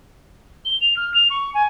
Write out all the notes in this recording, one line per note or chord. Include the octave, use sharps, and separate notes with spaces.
G7
F7
F6
F7
C#6
G#5